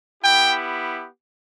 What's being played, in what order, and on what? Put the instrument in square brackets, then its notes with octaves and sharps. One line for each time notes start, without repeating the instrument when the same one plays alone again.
[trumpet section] B3 E4 G4 G5